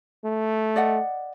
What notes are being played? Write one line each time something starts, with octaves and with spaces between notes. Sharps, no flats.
A3
D5 D#5 F#5